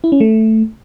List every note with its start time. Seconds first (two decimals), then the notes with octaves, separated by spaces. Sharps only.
0.04 E4
0.12 C#4
0.20 A3